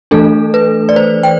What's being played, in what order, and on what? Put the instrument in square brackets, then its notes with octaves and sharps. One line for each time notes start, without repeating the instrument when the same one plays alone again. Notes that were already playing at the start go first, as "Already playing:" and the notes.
[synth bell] E3 A3 D4 A4
B4
D5
C5
G5